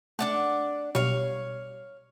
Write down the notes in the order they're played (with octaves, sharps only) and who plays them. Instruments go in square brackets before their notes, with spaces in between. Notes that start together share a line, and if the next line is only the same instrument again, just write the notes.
[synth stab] A3 [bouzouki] D4 D5 F#5
[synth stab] B1 B2 G3 [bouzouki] C#5 F5